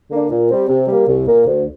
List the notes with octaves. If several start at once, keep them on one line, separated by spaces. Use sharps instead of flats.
D3 A#3 D4
A#2
G3 C4
C3
G3 A#3
C2
A#2 A#3
D2